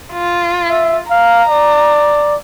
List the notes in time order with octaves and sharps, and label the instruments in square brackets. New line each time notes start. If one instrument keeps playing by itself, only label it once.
[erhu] F4
[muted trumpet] E5
[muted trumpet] F5 [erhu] A#5
[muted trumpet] D5